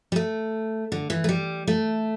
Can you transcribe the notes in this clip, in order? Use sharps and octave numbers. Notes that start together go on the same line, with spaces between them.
G3
A3
D3
E3
A3
G3
A3